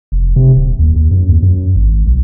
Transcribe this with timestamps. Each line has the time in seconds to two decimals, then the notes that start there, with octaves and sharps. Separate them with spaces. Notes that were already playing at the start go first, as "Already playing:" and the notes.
0.12 F1
0.36 C3
0.56 D#1
0.79 D#2
0.96 D#2
1.11 F#2
1.29 D#2
1.43 F#2
1.76 G#1
2.07 B1